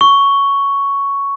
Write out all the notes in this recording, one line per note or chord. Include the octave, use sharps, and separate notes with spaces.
C#6